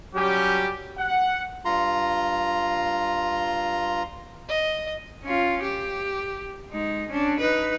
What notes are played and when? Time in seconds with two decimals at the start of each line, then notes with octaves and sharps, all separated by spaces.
0.15 F#3 G3 C#4 G4
0.99 F#5
1.65 G2 F4 A#5 C6
4.48 D#5
5.24 C#4 F4
5.63 G4
6.70 G#3 D#4
7.09 C#4 D4
7.40 D#4 B4